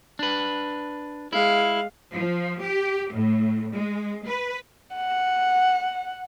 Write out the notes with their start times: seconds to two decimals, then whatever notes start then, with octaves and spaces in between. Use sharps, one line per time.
0.19 D4 B4
1.33 G#3 E4 F5
2.12 F3
2.61 G4
3.12 A2
3.74 G#3
4.27 B4
4.96 F#5